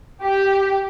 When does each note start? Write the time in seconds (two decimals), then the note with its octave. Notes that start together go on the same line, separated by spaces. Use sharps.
0.24 G4